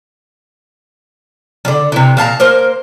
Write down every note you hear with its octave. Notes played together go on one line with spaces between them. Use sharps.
D3 G3
C3 E3
A#2 F5 A5 A#5
A#3 A#4 C5